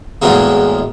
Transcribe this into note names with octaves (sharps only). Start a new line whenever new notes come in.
E2 A2 E3 F#3 G#3 A#3